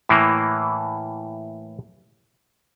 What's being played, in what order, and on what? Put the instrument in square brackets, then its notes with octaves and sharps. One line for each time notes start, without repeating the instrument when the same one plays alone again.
[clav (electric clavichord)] A2 E3 A#3